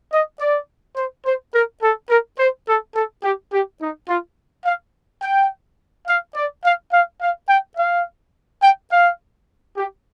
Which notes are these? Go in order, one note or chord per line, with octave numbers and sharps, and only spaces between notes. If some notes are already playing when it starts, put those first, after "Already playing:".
D#5
D5
C5
C5
A#4
A4
A#4
C5
A4
A4
G4
G4
D#4
F4
F5
G5
F5
D5
F5
F5
F5
G5
F5
G5
F5
G4